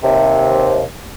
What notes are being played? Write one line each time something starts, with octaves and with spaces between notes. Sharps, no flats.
D#2 C3